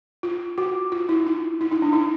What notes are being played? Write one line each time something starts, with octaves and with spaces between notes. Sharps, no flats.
F4
F#4
F4
E4
D#4
E4
D#4
D4
D#4